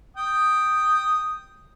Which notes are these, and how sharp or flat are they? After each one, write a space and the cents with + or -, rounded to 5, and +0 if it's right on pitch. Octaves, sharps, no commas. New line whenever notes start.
G5 +0 D#6 +0